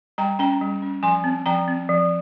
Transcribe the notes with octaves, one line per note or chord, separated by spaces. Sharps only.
G3 G5 A#5
C#4 G5 A#5
G3
C#4
F3 G#5 C6
C4
F3 G5 A#5
C4
F3